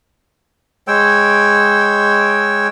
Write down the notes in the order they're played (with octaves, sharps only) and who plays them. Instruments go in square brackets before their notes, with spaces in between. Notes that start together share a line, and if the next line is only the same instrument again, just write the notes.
[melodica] G#3 C#5 G5 E6